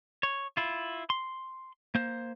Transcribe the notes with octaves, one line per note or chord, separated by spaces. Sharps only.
C#5
E4 F4
C6
A#3 C5